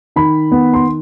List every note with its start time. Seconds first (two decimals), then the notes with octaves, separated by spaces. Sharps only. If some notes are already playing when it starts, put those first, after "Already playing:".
0.16 D#3 B5
0.52 B3
0.74 C6